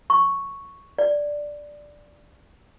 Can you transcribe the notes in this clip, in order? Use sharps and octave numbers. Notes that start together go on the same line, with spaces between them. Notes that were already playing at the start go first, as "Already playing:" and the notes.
C#6
D5